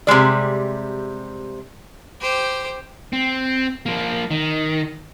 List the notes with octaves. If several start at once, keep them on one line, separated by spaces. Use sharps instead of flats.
C3 G3 G#3 D5
G4 C5
C4
F3 A#3
D#3